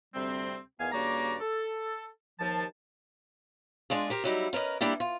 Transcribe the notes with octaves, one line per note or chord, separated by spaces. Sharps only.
D2 C3 G3 C4
E2 D#3 B3 F5 G#5
G2 C#3 A#3 F#4 D5 A#5
A4
D#2 F3 A5
G#3 D4 F4 G#4
G4 A#4 C5
F#3 G3 D#4 E4
C#4 A#4 B4 D#5
G3 A#3 D4 E4 G4
F4